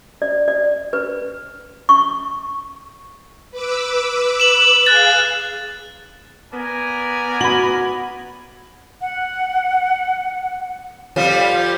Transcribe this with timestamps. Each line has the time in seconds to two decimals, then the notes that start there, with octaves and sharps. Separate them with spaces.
0.22 D5
0.48 D5
0.93 B4
1.89 C#6
3.51 B4 D6 E6
4.40 E7 F#7
4.87 G#4 F5 F#6 A6
6.53 B3 A#4 D5 G#5
7.41 F#4 B5 F#7
9.01 F#5
11.16 F2 F3 G3